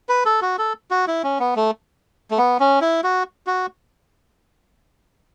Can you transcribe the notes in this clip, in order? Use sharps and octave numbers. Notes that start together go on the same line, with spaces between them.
B4
A4
F#4
A4
F#4
E4
C#4
B3
A3
A3
B3
C#4
E4
F#4
F#4